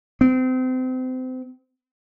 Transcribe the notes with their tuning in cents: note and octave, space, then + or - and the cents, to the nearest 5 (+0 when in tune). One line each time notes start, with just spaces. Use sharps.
C4 -30